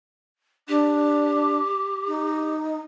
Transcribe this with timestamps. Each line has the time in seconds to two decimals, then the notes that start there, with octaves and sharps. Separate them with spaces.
0.69 D4 G4
2.08 D#4